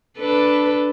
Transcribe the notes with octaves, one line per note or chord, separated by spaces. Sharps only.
D4 A4 B4